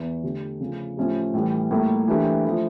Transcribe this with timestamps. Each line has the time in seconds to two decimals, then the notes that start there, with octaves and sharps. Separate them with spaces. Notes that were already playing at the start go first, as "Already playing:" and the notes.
Already playing: E2 E3
0.23 D3 A3 D4 G4
0.61 C#3 F3 A3 C#4
0.97 A2 F3 C#4 E4 G4
1.34 A2 E3 G3
1.71 A2 G3 A#3 E4 G4
2.08 E3 A3 D4 G4 A#4
2.45 F3 A3 E4